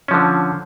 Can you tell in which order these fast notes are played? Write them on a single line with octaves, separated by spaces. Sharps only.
C#4 F3 D3